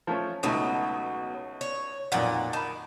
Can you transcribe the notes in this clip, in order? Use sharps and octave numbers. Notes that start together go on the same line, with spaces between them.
F3 A3 C#4
C#2 B2 F#3 A3 D#4
C#5
B1 F2 A#2 A#3 F#5
D#3 A5 B5